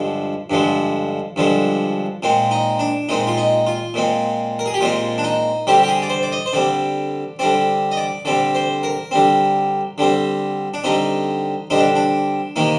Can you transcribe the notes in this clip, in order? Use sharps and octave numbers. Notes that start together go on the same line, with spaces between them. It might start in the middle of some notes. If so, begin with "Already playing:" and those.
Already playing: G2 D3 F3 G#3
G2 D3 F3 G#3
G2 D3 F3 G#3
A#2 G#3 C4
D#4
D4
A#2 G#3 C4 D#4
F4
D#4
F4
A#2 G#3 C4
A#4
G#4
G4
A#2 G#3 C4 F4
D4
D#4
D3 G3 C4 G4
G4
G#4
D5
C5
D5
D#5
C5
D3 G3 C4 D5
D3 G3 C4 D5
D#5
D5
D3 G3 C4 D5
C5
A#4
D3 G3 C4
D3 G3 C4
D4
D3 G3 C4 D#4
D3 G3 C4 D#4
D4
D4
C3 D#3 A#3 D#4